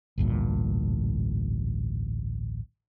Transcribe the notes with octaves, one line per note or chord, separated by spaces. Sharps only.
A1 D2 G2 A#2